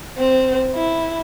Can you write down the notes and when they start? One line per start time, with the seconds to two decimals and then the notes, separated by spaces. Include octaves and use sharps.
0.18 C4
0.75 E4